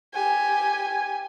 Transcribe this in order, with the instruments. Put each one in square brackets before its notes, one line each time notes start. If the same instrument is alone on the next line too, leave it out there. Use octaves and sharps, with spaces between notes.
[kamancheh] G4 G#5